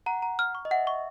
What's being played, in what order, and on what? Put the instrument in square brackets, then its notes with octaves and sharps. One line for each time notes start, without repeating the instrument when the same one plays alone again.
[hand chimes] F#5 [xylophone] A#5
[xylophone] A#5
F6
C#6
[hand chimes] D#5
[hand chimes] E5 [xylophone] F#5
[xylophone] C#6